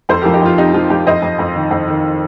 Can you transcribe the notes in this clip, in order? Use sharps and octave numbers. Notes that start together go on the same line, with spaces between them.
F2 A4 C5
F3 G4 A#4
D#4 G4
F2 F4
C3 D#4
F3 F4
F3 D#4 G4
F2 C5 D#5
F2
F2
D#3
F2
D#3